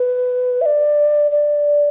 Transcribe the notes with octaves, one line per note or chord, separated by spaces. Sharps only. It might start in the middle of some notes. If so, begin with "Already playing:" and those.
Already playing: B4
E5
D5
D5